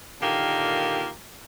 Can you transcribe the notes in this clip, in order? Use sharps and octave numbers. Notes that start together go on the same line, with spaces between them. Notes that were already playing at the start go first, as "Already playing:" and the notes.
A#2 D3 D#3 A#3 F4 G4